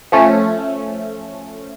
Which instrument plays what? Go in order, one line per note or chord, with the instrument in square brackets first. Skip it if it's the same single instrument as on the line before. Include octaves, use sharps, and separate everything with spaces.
[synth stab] F3 A3 C#4